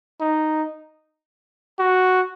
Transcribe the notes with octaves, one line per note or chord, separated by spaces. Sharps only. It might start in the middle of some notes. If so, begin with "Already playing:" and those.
D#4
F#4